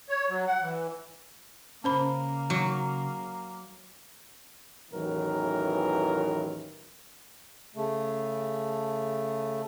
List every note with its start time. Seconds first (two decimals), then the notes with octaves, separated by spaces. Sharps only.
0.09 C#5
0.29 F#3
0.47 F#5
0.61 E3
1.84 C#3 A#3 C#4 C5 B5
2.50 F#3
4.91 A1 E2 D#3 E3 F#3 A#4
7.75 C#3 A3